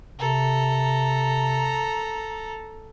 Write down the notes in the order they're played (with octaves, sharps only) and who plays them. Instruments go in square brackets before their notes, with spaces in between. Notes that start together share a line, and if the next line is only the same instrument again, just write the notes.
[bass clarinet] C3 [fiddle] A4 A#5